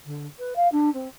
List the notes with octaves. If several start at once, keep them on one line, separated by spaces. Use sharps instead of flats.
D3
B4
F5
D4
C4